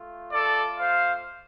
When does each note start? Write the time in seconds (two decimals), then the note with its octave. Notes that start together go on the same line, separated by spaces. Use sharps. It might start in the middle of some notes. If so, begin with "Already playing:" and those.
Already playing: A3 F4
0.32 A4 D5
0.80 C5 F5